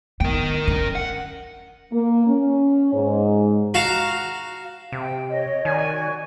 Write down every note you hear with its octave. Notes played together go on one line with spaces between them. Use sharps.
B3 A#4 G5
C#4
F#5
A#3
C#4
G#2
F#4 F5 A5 A#5
C3 G5
C#5 D#5
D#3 F#4 D5 G#5